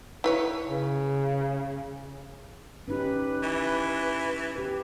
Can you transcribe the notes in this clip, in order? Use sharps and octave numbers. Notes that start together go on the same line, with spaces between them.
E4 B4 C#5
C#3
C#4 D#4 G4 B4
E3
G4 B4